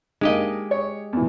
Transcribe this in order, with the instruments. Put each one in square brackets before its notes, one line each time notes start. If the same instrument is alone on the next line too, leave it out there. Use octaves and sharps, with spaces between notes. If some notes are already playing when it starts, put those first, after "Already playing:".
[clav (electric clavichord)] G#3 G4 D#5 [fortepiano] A#3 D4 D#4
[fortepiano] C#5
E2 E3